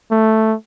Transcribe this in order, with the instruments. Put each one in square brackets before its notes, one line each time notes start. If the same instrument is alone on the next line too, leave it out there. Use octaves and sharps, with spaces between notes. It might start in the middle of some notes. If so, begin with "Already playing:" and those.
[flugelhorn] A3